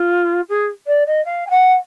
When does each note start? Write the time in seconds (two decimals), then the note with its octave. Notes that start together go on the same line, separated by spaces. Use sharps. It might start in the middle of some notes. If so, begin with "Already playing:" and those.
Already playing: F4
0.49 G#4
0.87 D5
1.06 D#5
1.25 F5
1.47 G#5
1.50 F#5